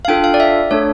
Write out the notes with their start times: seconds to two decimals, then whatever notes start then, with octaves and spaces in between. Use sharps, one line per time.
0.05 F5
0.08 D4 F4 A4 G5
0.24 F5
0.34 D5
0.40 E5
0.71 A3 D4 A4 C#5